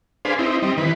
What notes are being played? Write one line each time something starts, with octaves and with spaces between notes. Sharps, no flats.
D4 G#4 B4 C5 F5
C4 D#4 E4
G3 C4 D#4
D#3 E3 B4